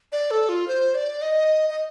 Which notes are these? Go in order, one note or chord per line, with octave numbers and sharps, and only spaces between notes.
D5
A4
F4
C5
D5
D#5
D#5